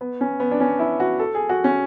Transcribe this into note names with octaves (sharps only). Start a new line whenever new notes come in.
B3
C#4
B3
D4
C#4
E4
F#4
A4
G#4
F#4
C#4